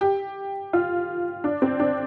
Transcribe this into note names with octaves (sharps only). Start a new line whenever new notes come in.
G4
F4
D4
C4
D4